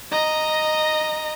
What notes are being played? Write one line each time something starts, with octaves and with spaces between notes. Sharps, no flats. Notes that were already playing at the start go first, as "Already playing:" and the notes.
D#5 A#5